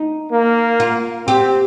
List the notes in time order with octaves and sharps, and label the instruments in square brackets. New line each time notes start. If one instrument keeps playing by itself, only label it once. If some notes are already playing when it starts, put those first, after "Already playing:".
Already playing: [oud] D#4
[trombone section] A#3
[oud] F4
[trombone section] C4 [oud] G4